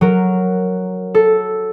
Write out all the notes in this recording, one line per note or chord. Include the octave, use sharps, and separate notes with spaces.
F#3 A#4
A4